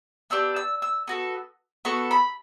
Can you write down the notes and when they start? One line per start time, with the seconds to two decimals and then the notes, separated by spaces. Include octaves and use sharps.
0.30 B3 D4 G4 E6
0.56 E6
0.82 E6
1.07 B3 F#4 A4
1.85 B3 F#4 A4 C#6
2.11 B5